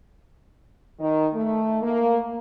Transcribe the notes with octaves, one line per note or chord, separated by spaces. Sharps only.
D#3
A3
A#3